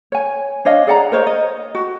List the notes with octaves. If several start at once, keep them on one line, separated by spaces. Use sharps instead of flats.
C#5 G#5
D4 C#5 D#5 F5
G#4 D5 F#5 A#5
A#4 C5 C#5 D#5
D#5
F#4